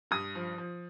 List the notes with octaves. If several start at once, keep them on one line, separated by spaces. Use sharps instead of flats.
G2 D#6
F3
F3